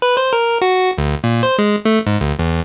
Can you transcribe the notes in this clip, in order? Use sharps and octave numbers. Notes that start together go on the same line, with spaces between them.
B4
C5
A#4
F#4
D2
A#2
C5
G#3
A3
G#2
D2
E2